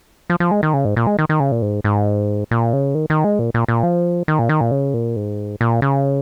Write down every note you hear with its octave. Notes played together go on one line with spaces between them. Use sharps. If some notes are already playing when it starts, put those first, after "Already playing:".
F3
F3
G#3
D#3
C#3
G#2
A#2
G#3
D#3
D#3
C#3
A#2
G#2
G#2
A#2
C#3
D#3
D#3
G#3
A#2
A#2
A#2
F3
D#3
A#2
D#3
A#2
C#3
A#2
G#2
A#2
C#3